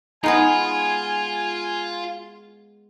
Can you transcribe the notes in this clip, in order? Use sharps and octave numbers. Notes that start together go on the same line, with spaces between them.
G#3 B3 D#4 F4 G#4 G#5